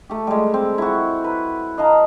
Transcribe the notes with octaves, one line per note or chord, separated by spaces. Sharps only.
A3 G4
G3 G#3
C4
E4 F#4
B4
D#5 F5 A5 A#5